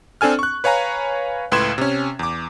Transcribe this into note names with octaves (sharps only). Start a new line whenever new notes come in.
C4 D4 A4 G#5 F6
C#6 F#6
B4 C#5 F5 G#5 A#5
C#2 A2 B4 C6 G#6 E7
C3 C#4
E2 D6